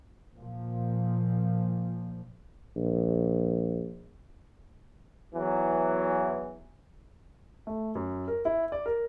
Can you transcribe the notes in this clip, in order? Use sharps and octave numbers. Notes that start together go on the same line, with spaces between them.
A#2 F3
A#1
E2 E3 F#3
A3
F#2
A#4
E4
D5
A#4